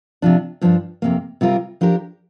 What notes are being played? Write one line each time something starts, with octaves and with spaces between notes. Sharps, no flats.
C3 F3 D4
G2 F3 D4
F2 C3 A#3
C3 G3 C4 F4 A#4
F3 D4 G4 A#4